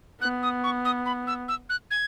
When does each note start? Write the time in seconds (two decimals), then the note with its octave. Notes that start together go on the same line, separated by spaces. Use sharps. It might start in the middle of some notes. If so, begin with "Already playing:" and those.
0.22 B3 F#6
0.43 D#6
0.64 C#6
0.85 D#6
1.06 B5
1.27 E6
1.48 E6
1.70 F#6
1.91 G#6